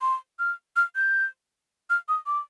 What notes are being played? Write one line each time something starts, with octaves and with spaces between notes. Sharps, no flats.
C6
F6
F6
G6
F6
D#6
D6